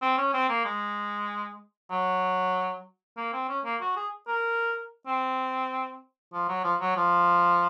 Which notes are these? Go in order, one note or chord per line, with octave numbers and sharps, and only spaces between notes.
C4
C#4
C4
A#3
G#3
F#3
A#3
C4
C#4
A#3
F#4
G#4
A#4
C4
F3
F#3
F3
F#3
F3